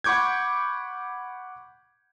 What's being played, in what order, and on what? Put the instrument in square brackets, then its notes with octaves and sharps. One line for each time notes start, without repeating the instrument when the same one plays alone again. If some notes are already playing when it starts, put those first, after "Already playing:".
[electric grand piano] F#5 B5 C#6 D6 G6 G#6